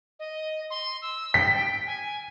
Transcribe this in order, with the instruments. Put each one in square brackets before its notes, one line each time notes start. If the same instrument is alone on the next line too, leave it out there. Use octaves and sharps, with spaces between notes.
[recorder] D#5
C6
E6
[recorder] G5 [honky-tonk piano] B6
[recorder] G#5